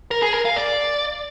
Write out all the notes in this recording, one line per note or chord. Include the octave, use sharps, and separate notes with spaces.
A#4
G#4
A#4
F5
D5